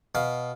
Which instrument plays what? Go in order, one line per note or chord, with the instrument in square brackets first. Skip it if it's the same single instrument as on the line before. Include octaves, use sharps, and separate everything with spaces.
[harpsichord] B2 F5